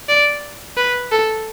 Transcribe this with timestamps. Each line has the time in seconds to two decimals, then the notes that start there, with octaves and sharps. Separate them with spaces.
0.09 D5
0.77 B4
1.12 A4